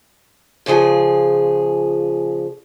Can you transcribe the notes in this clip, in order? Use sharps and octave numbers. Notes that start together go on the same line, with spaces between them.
A#2 C#3 F3 G#4